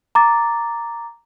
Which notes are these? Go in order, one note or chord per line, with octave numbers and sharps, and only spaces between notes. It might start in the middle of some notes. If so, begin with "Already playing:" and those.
A#5 D6 A6